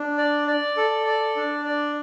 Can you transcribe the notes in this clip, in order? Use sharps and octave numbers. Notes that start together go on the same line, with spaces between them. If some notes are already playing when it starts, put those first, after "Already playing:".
Already playing: D4
D5
D5
A4
D5
D4
D5